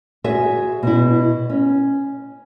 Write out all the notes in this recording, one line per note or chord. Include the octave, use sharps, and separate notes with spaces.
F#4 G#4 E5
B2 E4
C#4